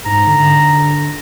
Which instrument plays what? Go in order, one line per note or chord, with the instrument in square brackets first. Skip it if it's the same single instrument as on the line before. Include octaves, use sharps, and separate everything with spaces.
[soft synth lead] G#2 [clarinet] A#5
[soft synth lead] D3